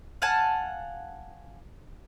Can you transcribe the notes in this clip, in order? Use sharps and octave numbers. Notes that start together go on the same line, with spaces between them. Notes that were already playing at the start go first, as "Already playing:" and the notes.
F5 F#5 G#5 A5